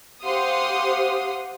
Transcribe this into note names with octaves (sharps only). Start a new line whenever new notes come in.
G4 C5 F5 F#5 C6 D#6